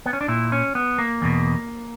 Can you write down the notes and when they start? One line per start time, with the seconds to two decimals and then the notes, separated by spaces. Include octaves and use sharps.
0.06 B3
0.13 C#4
0.21 D4
0.28 A#2 E4
0.52 C#4
0.75 B3
0.98 A#3
1.22 E2 B2